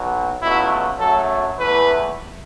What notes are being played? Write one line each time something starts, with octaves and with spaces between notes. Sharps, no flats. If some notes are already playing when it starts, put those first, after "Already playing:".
Already playing: B1 B2 F#3
C#2 B2 F#3 A3 E4
F#2 F#3 A3 A4
E2 E3 A3 B4